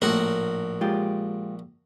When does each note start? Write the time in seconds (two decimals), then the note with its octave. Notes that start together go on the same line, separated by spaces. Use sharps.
0.02 A#1 A2 A3 A#3 F#4 A#4
0.81 G#3 F4 G4